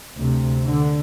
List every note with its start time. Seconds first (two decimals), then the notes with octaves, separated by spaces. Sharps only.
0.16 D2 C3
0.66 D3